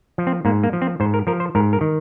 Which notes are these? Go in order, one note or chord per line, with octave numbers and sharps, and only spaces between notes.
F3
C4
G#2 A#3
A#3
F3
C4
G#2 C5
A#4
F3 A#4
C5
G#2 A#4
A#4
D#3